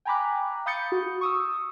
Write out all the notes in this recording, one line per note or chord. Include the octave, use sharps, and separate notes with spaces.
G5 G#5 A#5 B5 D6 F#6
F5 B5 D#6 G6 A6 C#7
F#4
C#6 D#6 E6